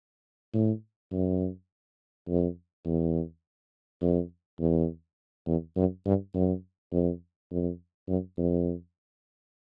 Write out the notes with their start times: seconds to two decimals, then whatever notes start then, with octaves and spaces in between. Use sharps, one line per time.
0.53 A2
1.12 F#2
2.28 F2
2.86 E2
4.01 F2
4.60 E2
5.47 E2
5.76 F#2
6.05 G2
6.34 F#2
6.92 F2
7.51 F2
8.08 F#2
8.38 F2